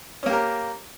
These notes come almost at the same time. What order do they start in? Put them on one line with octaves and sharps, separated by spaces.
C#4 A#3 G4 A#4